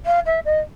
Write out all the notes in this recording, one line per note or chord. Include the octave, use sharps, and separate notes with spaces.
F5
E5
D#5